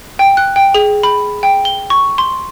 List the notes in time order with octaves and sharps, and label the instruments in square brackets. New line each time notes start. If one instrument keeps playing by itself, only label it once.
[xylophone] G5
F#6
G5
G#4
B5
G5
G7
C#6
C6